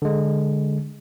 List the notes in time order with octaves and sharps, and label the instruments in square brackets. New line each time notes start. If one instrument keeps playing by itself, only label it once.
[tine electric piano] D3 G#3